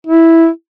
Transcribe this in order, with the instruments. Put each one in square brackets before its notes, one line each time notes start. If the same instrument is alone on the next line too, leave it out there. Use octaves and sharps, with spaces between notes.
[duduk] E4